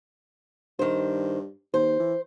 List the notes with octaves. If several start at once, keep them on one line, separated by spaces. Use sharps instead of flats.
G2 D#3 C5
D#2 C5
E3